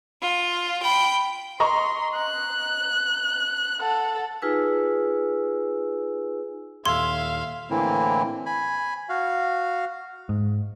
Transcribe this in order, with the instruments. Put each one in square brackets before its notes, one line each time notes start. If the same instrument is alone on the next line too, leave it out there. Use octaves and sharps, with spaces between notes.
[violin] F4
G5 B5
[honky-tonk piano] D#5 A#5 C#6 [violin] C6
[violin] F#6
A4 F#5
[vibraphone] D#4 F4 G#4 B4 G#5 E6
[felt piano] D#1 E6 G#6 [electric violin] E5 F5 [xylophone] C6
[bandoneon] A2 D3 E3 A#3 C4 E4
G#5 B5
F#4 F5
[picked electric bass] G#2